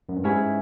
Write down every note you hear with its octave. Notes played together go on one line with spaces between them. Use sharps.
F#2
G2
G#2 C#4 E4 G#4 B4